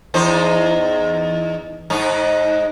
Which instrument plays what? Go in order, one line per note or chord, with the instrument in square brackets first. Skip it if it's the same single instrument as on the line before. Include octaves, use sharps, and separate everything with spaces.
[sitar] E2 D#4 C5
G#2 D#4